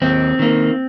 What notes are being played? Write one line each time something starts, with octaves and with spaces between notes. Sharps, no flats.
D#2 C4
D#3 A#3